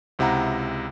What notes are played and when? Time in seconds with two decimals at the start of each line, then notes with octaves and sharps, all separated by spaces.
0.19 C#2 C3 E4 F#5 A#5